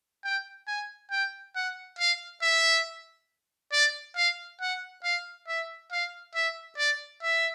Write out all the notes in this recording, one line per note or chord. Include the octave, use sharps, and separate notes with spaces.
G5
G#5
G5
F#5
F5
E5
D5
F5
F#5
F5
E5
F5
E5
D5
E5